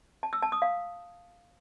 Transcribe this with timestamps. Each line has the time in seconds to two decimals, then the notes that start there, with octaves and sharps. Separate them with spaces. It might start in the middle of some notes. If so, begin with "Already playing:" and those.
0.23 A5
0.33 E6
0.42 A5
0.52 D#6
0.62 F5